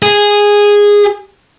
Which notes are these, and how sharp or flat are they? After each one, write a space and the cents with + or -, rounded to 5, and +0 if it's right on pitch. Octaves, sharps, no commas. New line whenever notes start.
G#4 -10